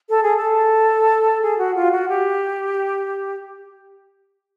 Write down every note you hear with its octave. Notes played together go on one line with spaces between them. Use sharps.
A4
G#4
A4
G#4
F#4
F4
F#4
G4